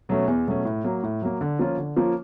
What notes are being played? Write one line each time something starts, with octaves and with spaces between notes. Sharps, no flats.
B2 F#3 A3 C#4
E2
B2 F#3 A3 C#4
A2
F#3 A#3
A2
F#3 A#3
D3
F3 A#3 C#4 F4
D3
F3 A#3 C#4 F4